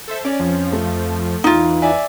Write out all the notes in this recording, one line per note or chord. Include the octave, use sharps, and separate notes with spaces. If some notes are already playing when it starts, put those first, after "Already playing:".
A4 C5 E5
C#4 D5
F2 F3
A3
E2 E3 D#4 F4
D5 E5 G#5